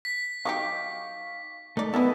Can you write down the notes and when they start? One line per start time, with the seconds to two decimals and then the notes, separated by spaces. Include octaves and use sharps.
0.05 B6
0.45 F#3 D#4 G4 F5 C#6 D6
1.77 A3 D#4 D5
1.94 D#3 G#3 B3 E4 A4 B4 D#5